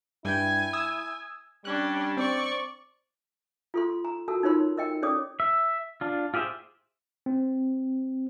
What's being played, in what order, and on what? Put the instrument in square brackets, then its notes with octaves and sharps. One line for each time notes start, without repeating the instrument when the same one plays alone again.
[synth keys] G2 G5 [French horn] E4 [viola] G#5
[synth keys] D#6 E6
[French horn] G3 [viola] C#4 D4 [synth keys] F#6
[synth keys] C4 [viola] D5 C#6
[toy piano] F4 A4 C6
A#5
F#4 A4 A#4 A5
D#4 F4 A#4 C#5 B5 C6
A#4 D#5 G5
C#4 A4 C#5 D5 D6 D#6
[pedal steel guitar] E5
D4 F4
F4 G4 G#4 C5 E5
[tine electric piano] C4